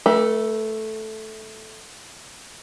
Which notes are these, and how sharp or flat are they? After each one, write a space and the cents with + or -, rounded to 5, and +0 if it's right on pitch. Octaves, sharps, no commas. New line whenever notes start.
A3 -5 B4 -45